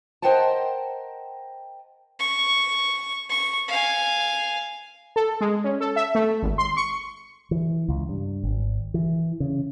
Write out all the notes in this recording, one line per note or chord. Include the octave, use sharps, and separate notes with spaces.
A#4 C5 D#5 F#5 G5 A5
C#6
C#6
F5 G#5
A4
G#3
C#4
A4
E5
A3
G#1
C6
C#6
E3
C#2
G2
G#1
E3
C#3